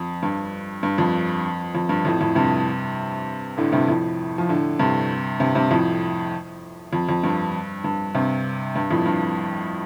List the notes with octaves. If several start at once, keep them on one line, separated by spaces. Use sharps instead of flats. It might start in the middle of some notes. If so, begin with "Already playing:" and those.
Already playing: F2
G2
G2
F2
F2
G2
F2 A2
F2 A2
G2 C3
A2 D3
G2 C3
F2 A2
F3
A2 D3
G2 C3
G2 C3
G2 C3
F2 A2
F2
F2
G2
G2
G2 C3
G2
F2 A2
G2